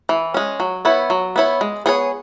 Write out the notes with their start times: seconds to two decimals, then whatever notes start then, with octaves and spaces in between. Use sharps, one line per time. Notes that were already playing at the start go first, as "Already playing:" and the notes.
0.09 E3
0.34 G#3 C#4
0.60 F#3
0.85 B3 E4 C#5
1.10 F#3
1.36 B3 E4 C#5
1.61 G#3
1.86 B3 G#4 C#5